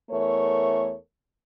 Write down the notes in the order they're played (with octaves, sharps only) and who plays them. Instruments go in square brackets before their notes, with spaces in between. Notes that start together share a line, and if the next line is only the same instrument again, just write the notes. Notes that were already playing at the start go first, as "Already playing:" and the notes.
[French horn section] E2 A3 A#4 C#5